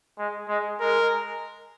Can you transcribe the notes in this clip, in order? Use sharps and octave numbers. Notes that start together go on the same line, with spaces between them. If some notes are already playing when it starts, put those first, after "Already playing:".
G#3
G#3
G#3 A#4